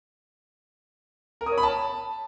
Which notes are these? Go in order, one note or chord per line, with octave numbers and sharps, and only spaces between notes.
A#4
D#6
C#5
B5
A5